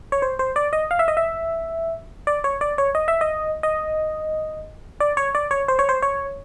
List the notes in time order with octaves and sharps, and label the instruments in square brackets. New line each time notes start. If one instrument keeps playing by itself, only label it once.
[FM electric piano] C#5
C5
C5
D5
D#5
F5
E5
D#5
E5
D5
C#5
D5
C#5
D#5
E5
D#5
D#5
D5
C#5
D5
C#5
C5
C#5
C5
C#5